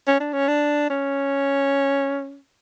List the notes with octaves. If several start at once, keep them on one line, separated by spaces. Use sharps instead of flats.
C#4
D4
C#4
D4
C#4